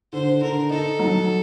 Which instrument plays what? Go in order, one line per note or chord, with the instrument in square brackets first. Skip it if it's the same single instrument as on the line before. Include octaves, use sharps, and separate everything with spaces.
[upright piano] D3 [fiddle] C5
[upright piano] D3 [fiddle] A#4
[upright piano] D#4 [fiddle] A4
[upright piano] F#3